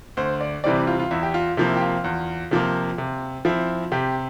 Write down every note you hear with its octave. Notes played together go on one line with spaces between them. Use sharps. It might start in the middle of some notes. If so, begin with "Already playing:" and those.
D2 C5
D5
C3 E3 G3 C4 D5
F4
F4
E2 E4
G4
F4
C3 F3 A#3 E4
G4
F4
E2
C3 F3 A#3
C3
F3 C4 E4
C3 G4